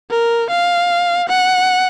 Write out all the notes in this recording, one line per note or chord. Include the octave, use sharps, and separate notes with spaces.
A#4
F5
F#5